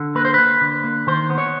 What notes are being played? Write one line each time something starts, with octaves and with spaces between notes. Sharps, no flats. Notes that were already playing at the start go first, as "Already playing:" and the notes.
Already playing: D3
A#3 B4
C5
A#3 B4
D3
A#3
D#3 C5
B3
C#5